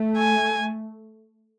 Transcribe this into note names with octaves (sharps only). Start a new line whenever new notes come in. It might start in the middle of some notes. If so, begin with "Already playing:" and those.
Already playing: A3
G#5